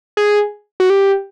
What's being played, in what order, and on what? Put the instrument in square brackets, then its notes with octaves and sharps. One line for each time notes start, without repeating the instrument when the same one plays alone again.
[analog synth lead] G#4
F#4
G4